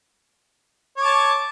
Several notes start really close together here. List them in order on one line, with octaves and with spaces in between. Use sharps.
C#5 D6 A5